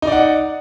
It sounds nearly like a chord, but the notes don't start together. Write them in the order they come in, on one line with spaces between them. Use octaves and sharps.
D#4 D5 F#5